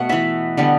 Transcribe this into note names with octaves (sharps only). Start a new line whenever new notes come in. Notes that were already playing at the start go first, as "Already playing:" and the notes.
Already playing: B2 A3 F#5
E3 B3 E5
D3 G3 B3